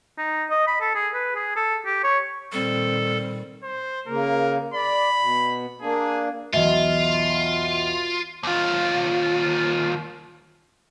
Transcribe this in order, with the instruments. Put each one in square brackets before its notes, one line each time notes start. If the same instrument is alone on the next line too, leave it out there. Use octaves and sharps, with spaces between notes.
[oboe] D#4
D#5
B5
A4
G#4
B4
G#4
A4
G4
C#5
[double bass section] A#2 D#3 [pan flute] G3 [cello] C4 [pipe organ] A4
[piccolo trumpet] C5
[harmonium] C#3 A#3 [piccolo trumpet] A#4
[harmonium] D5 [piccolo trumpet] B5
[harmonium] B2
[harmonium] A#3 D4 [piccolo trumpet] G#4
[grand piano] B1 E2 [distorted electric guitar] F4 [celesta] D#5 E5
[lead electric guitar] D#2 F4